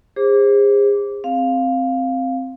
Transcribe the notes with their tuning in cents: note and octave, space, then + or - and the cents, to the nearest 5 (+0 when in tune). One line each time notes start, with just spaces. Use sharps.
G#4 -40 C5 +20 D6 -15
C4 +0 F5 +0